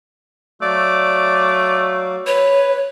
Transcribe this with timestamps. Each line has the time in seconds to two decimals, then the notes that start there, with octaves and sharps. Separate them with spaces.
0.62 F#3 A3 F#4 D5 F5
2.27 B4 C#5